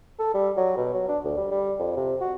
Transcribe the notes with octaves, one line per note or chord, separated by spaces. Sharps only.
A4
G3
F#3
B2
F#3
D4
D2
G3
G3
F2
C3
F#4